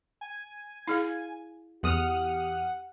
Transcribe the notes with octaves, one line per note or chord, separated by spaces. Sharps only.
G#5
E4 G#4 F5
E2 G4 F#5 D#6 F6